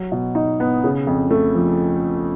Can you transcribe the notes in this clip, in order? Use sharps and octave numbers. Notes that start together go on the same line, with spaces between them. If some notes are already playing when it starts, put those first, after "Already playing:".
Already playing: F#3
B2
D#4
B3
C#3
F2
A3
F3